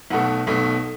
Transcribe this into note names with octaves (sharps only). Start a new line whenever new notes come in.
B1 B2 A3 F#5
B1 B2 A3